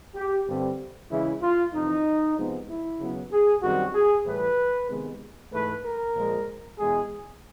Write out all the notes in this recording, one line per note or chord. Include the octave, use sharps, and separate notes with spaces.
G4
G2 D3 G3 C4
C#3 E3 G#3 E4
F4
F2 C3 E3 D#4
C3 F3 G#3 B3
E4
C#3 F#3 B3
G#4
F#2 D#3 G3 C4 F#4
G#4
A2 E3 G3 B4
C3 D#3 G#3 B3
G#2 E3 A3 B4
A#4
A#2 F3 G#3
E2 B2 G#3 G#4